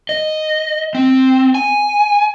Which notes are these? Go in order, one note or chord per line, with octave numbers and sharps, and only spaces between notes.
D#5
C4
G#5